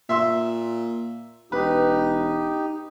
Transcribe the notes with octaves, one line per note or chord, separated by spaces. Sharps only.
A#2 E5 C6 E6
E1 D#4 G4 B4